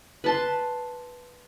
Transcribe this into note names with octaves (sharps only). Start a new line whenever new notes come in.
B4 A5 C6